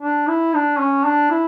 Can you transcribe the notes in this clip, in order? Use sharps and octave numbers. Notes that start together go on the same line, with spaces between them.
D4
E4
D4
C#4
D4
E4